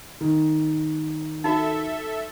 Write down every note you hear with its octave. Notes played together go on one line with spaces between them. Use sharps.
D#3
D#4 F#4 A4 E5